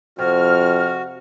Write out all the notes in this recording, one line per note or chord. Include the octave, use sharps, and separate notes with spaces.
F2 C3 F#4 F6